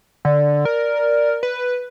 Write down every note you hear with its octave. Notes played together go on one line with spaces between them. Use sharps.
D3 D5
A#4
B4